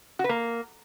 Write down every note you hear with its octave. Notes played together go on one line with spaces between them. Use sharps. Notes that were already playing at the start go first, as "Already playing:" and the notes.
F#4
B4
A#3